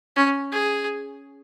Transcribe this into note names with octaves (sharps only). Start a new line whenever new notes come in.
C#4
G#4